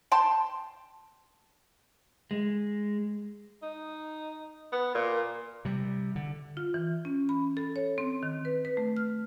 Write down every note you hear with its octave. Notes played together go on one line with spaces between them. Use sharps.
G5 A5 C6
G#3
D#4
B3
A#2
C3 G3
D3
F4
E3
C#4
B5
A4
C#5
C4
D#3
B4
B4
A3
F6